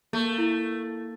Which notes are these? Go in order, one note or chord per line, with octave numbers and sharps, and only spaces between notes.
A3 A#3
E4